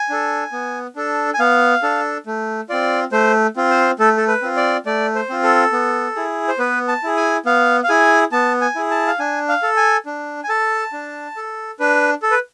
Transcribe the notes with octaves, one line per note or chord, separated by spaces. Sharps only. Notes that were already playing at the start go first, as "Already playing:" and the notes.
Already playing: G#5
D4 A4
B3
D4 A4
G#5
B3 F5
D4 A4
A3
C4 F4 D5
A3 C5
C4 F4
C5
A3 A4
A4
B4
C4 F4
D5
A3 D5
C5
C4 F4
A4
B3
E4 G#4
C5
B3 B4
A5
E4 G#4
G#5
B3 F5
F5
E4 G#4 G#5
B3 A5
G#5
E4 G#4
A5
F5
D4 G#5
F5
A4
G#5
D4
G#5
A4 A5
D4
A4
D4 B4
A4
B4